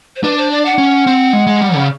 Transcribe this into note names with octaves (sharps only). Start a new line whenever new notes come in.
C5
D4 B4
C5
D5
F#5
C#4
C4
G#3
G#3
G3
C#3